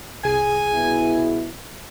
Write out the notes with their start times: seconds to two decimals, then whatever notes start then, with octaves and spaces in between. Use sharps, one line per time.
0.24 C2 G#4 G#5
0.74 B2 B3 E4